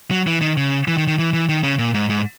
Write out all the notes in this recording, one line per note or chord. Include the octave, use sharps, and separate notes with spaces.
F#3
E3
D#3
C#3
E3
D#3
D#3
E3
E3
D#3
C#3
A#2
G#2
G#2